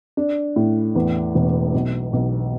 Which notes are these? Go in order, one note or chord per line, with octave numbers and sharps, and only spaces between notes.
D4
A2
E2
E1
B1
B1